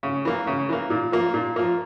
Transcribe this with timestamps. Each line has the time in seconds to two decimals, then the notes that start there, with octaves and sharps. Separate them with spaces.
0.03 C#3
0.25 E3 A#3
0.47 C#3
0.69 E3 A#3
0.90 A#2
1.12 F3 A#3
1.34 A#2
1.56 F3 A#3